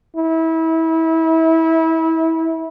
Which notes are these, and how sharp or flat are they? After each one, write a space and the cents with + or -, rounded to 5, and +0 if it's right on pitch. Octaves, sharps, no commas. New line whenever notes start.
E4 -25